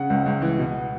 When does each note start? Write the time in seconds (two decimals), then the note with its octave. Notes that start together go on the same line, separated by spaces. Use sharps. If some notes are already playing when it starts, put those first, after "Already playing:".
Already playing: C#3 F#5
0.10 C#2
0.26 C#2
0.42 E3
0.59 B2